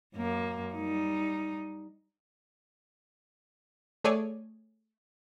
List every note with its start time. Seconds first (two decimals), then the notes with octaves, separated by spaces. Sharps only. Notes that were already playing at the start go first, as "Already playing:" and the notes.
0.16 F#2 A#3
0.75 G3 D#4
4.04 A3 G#4 A4 C#5 D5 G#5